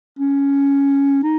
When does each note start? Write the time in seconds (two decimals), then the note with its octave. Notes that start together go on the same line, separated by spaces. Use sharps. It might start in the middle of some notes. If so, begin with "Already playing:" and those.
0.19 C#4
1.23 D#4